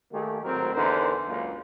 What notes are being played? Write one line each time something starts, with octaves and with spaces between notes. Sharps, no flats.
D#3 A3 A#3 G4 G#4
G#1 A2 F#3 C4 A#4
E2 D3 D#4 A#4 C5
C#2 F#2 A#3